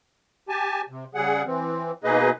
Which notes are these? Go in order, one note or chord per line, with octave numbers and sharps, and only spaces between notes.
G4 G#5 A5
C3
C#3 G3 G#4 F#5
E3 C4
B2 A#3 D#4 G#4 B4 D#5